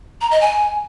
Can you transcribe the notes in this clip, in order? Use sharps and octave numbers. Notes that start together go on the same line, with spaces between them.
A#5
D#5
G#5